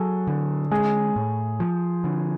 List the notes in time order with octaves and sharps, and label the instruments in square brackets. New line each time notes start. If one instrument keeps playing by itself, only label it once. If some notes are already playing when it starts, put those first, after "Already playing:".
Already playing: [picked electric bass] F#3 [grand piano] G#4 A4
[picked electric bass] D3
[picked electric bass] G#3 [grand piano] G#4
[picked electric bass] A2
F3
D3